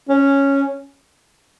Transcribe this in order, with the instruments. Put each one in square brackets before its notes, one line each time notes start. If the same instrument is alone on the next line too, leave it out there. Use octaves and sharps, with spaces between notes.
[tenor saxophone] C#4